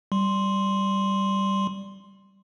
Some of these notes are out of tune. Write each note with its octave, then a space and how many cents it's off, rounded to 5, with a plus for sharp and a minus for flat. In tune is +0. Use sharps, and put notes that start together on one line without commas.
G3 -10 C6 +0